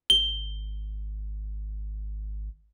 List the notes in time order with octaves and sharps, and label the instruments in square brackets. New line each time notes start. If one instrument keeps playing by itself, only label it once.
[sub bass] G#1 [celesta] G7